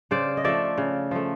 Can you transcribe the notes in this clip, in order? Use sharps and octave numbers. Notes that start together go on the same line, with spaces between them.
C#3 C5 D5
D#5
F3 A3 D5 E5
C#3
F3 A3